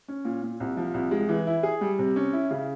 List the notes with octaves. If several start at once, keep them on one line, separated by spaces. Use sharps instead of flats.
C#4
A#2
A#2
C2
F3
C2
G#3
E3
E4
G#4
G3
C3
C#4
E4
C#3